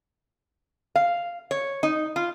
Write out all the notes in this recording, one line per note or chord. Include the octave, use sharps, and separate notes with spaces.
F5
C#5
D#4
F4